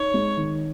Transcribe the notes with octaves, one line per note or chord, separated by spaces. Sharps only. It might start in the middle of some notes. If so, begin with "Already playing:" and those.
Already playing: D#4 C#5
G#3
D#3